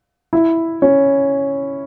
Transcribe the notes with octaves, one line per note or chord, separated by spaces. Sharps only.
E4
C#4